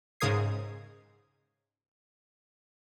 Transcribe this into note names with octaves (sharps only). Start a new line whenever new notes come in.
G#2 C#3 A#4 D#6 G#6 C7